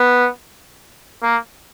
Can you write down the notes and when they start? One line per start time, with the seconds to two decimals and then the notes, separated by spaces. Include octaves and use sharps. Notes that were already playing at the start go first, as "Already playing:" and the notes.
Already playing: B3
1.22 A#3